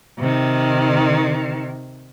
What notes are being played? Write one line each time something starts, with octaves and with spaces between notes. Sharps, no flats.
C3 D#3